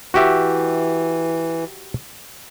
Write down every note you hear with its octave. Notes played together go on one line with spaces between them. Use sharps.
E3 F#4 G4 E5